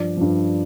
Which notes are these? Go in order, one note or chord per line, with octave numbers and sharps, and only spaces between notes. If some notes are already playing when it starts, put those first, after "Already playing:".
Already playing: G2 F3 D5
G2 F3